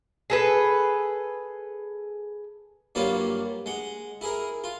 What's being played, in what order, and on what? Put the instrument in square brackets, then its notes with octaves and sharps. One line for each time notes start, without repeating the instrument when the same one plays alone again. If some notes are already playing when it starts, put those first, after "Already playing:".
[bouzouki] G#4 A4 B4
[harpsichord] G2 F#3 G3 A#3 F4 C#5
G#3 F#5
E4 G#4 A#4
F4